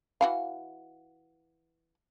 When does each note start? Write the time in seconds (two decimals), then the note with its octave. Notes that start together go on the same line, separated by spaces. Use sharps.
0.21 E3 F#4 F5